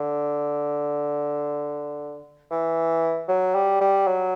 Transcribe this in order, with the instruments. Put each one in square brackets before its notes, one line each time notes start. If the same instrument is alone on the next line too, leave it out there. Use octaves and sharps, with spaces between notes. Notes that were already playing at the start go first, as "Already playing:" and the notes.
Already playing: [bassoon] D3
E3
F#3
G3
G3
F#3